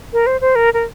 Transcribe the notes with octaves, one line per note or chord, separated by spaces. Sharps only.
A#4
C5
C5
A#4
A#4